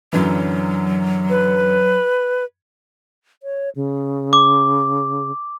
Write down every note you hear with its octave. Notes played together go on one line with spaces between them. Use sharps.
F#2 D3 E3 F#3
B4
C#5
C#3
D6